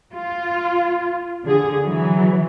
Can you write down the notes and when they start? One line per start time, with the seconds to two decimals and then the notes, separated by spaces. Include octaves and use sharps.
0.13 F4
1.44 D3 G#4
1.83 E3 F#3